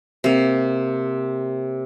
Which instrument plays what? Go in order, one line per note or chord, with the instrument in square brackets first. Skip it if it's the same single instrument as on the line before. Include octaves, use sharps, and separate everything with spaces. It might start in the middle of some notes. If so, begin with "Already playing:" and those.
[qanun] C3 A#3